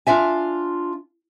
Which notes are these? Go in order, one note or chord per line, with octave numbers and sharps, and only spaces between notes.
D4 F4 E5 G#5